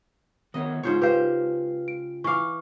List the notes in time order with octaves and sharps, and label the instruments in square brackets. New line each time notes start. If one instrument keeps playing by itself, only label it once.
[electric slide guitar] D#3 B3 C#5 [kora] D#5
[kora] G#2 C5 C#5 [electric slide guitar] C#3 F4
[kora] G4 C5 [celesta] B4 F5
[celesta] D7
[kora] E3 F5 [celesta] C#6 D6